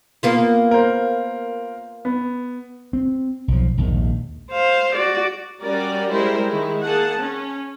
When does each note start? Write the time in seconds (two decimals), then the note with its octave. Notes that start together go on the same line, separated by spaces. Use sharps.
0.23 A#3 B3 F4
0.71 A#4 C5
2.05 B3
2.93 C4
3.48 B1 F3
3.78 A#1 D#2 G#2 D#3
4.52 C5 F5
4.96 F#4 D5
5.60 G3 C#4 F#4 A#4 D5
6.10 G3 G#3 E4 A#4 C5
6.49 D#3 G#3 E4
6.84 A#3 G#4 F#5 A5
7.18 C#4